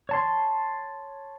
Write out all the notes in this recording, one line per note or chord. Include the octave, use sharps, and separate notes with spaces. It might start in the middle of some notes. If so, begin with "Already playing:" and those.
C#5 A5 C6